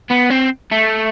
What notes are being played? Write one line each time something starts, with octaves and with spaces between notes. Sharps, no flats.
B3
C4
A3